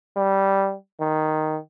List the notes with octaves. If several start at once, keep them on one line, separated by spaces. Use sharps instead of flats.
G3
D#3